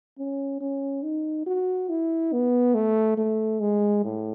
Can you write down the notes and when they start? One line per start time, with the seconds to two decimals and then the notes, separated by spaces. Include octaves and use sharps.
0.18 C#4
0.61 C#4
1.03 D#4
1.46 F#4
1.90 E4
2.33 B3
2.75 A3
3.17 A3
3.61 G#3
4.04 A2